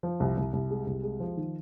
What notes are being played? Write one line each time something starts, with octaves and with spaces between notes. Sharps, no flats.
F3
C2
C2
C2
G#3
C2
G#3
F3
D#3